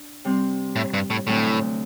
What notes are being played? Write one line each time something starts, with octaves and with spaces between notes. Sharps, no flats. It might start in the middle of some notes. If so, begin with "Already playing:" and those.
Already playing: D4
C3 G3 C4
A2
G2
A2
D2 A2 C3 F#3 A3